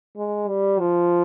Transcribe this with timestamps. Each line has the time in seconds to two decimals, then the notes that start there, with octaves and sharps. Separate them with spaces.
0.17 G#3
0.48 G3
0.80 F3